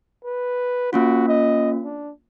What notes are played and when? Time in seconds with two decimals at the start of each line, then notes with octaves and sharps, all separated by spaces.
0.25 B4
0.93 A#3 C#4 F4 F#4
1.28 D#5
1.84 D4